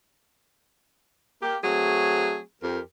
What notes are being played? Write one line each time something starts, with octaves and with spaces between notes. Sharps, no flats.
A#3 G4
F#3 A3 C4 G#4
F2 G4 A#4